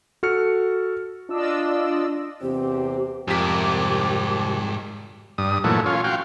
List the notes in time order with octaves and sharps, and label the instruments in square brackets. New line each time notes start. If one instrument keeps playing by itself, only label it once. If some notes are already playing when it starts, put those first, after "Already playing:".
[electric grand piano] F#4 A4 F6 C#7
[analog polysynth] D4 F4 D5 D#5 E6
[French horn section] E2 C3 C4 [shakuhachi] G4
[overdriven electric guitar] C2 [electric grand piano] F2 B6 [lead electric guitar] G#2 A#4 [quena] G4
[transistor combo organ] G2 D#6
A#2 E3 F#3 A3
C#4 F4
F#4 F5 G5